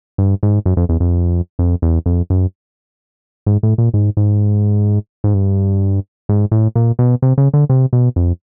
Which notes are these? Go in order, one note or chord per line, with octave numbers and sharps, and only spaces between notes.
G2
G#2
F#2
F2
E2
F2
F2
E2
F2
F#2
G#2
A2
A#2
G#2
G#2
G#2
G2
G#2
A2
A#2
B2
C3
C#3
D3
C3
B2
F2